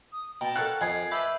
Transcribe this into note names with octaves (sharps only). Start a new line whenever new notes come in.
D#6
B2 G5 A5 A#5
A4 A#4 C#5 F5 F#5 F#6
F2 D#5 G#5 G#6 C7
B4 E5 A5 B5 D6 E6 G6